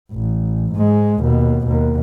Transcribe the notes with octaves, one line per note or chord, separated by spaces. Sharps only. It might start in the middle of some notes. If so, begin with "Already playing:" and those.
A1
G#2 G#3
D#2 B2
D#2 B2